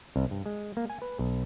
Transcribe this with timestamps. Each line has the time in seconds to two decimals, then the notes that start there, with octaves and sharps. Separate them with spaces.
0.16 C2
0.31 G2
0.46 G#3
0.77 A#3
0.90 G#5
1.02 B4
1.19 B1